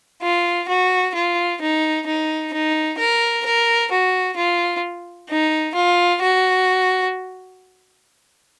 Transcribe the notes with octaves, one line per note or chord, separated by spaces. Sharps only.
F4
F#4
F4
D#4
D#4
D#4
A#4
A#4
F#4
F4
D#4
F4
F#4